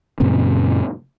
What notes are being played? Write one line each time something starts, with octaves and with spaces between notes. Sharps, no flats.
F#2 A#2 C#3 C4